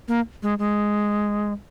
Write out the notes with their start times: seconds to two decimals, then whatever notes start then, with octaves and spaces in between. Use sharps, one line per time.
0.08 A#3
0.43 G#3
0.59 G#3